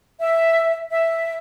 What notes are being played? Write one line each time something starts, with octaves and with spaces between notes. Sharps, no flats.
E5
E5